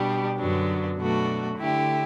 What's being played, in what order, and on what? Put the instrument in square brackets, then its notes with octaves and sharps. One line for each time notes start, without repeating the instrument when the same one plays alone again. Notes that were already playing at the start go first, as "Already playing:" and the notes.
Already playing: [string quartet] B2 G3 D4 G4
F#2 D3 F#3 B3 D4
B2 F#3 A3 D4 F#4
D3 A3 E4 G4